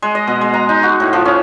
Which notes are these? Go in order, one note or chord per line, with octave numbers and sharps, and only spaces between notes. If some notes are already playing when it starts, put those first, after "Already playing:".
G#3
D#5
B2
G#3
A#5
D#4
F#4
A2
F3
C#4